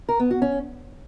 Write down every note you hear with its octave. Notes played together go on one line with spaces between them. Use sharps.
A#4
B3
F#4
C#4